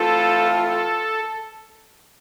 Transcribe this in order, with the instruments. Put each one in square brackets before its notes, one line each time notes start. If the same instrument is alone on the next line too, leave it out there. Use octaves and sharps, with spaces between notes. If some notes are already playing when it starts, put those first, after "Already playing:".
Already playing: [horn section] E3 A3 C4 F4 [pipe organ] A4
[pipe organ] A4